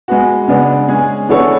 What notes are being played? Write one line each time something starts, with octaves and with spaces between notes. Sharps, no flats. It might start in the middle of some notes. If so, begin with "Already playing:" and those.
G#3 B3 F#4
C#3 G#3 B3 D4
G#3 C#4 G#4
E3 B3 D4 A4 C#5